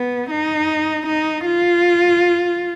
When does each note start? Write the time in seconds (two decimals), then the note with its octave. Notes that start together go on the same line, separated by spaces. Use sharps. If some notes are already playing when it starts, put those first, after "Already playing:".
Already playing: B3
0.30 D#4
1.06 D#4
1.46 F4